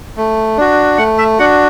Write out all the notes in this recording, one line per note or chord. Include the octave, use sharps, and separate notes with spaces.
A3
D4 F#4
A3 F#5
E5
D4 F#4 F#5